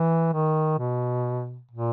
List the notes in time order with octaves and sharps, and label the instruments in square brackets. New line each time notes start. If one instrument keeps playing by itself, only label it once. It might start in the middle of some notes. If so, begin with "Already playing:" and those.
Already playing: [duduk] E3
D#3
B2
A#2